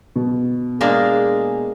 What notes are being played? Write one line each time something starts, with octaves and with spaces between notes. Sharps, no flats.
B2
G#3 A#3 D4 G#4